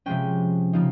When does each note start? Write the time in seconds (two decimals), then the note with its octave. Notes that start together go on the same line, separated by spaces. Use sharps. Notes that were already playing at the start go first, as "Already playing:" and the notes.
0.06 C3 F3 G#3 C#4 G5
0.73 C#3 F3 A#3 D#4